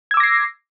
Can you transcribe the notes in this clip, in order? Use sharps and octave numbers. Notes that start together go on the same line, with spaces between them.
D6 E6 G#6 A#6 C7